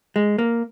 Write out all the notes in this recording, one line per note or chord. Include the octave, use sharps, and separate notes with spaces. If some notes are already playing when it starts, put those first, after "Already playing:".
G#3
A#3